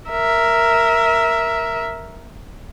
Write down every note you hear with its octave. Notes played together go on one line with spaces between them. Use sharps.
A#4 E5